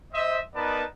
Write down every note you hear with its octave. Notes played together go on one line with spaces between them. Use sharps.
C5 D#5 E5
B3 D#4 A#4 B4 D5 A5